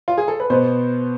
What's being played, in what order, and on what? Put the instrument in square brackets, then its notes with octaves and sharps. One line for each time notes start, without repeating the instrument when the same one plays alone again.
[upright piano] F4
G#4
A4
B4
B2 B3 C5